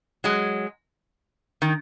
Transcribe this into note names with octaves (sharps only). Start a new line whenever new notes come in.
F#3 G#3
D#3